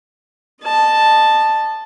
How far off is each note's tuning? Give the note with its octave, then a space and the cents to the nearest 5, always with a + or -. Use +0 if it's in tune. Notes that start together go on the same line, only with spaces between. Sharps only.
D#5 -25 A5 +0